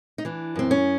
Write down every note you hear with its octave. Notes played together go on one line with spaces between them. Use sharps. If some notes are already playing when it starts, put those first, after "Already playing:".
D#4
E3 D4
F#2 C4
C#4